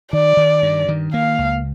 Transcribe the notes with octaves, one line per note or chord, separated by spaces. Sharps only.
D#3 D5
D#3
G2
D#3
A#3 F5
C#2